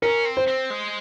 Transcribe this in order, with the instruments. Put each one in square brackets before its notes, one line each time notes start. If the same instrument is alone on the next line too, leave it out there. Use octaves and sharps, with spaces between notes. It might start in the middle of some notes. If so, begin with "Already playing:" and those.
[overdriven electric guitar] C#4 [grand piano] A#4
[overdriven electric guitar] C4
[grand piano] C5
[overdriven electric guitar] C4
G#3